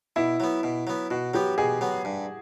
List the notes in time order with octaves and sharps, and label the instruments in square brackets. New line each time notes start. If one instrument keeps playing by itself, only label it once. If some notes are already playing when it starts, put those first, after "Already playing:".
[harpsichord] B2 [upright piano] E4
[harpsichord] F#3 B3
B2
F#3 B3
[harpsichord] B2 [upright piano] F#4
[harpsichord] F#3 B3 [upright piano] G4
[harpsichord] B2 [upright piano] G#4
[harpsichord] F#3 B3
G2